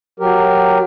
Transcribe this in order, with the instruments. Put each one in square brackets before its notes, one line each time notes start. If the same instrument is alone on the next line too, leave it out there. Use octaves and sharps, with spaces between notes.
[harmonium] F#3 G4 A#4